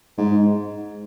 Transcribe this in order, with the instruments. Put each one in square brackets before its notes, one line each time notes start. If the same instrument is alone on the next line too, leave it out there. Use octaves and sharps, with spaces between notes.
[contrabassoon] G#2